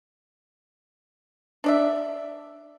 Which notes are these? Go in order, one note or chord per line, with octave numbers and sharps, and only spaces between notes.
D4 D5 E5